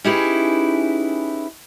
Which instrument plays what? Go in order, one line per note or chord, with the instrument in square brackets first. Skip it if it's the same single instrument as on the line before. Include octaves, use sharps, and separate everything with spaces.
[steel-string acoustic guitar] C#4 D#4 E4 G4 G#4 B4